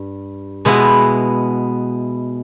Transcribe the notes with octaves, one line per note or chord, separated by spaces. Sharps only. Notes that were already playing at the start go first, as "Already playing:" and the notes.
Already playing: G2
B2 G#3 B3 E4